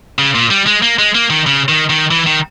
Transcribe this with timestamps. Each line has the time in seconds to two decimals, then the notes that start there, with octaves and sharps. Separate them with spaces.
0.19 C#3
0.35 A#2
0.50 G3
0.67 G#3
0.82 A#3
0.99 G#3
1.15 A#3
1.30 D#3
1.47 C#3
1.69 D#3
1.90 D#3
2.11 E3
2.27 D#3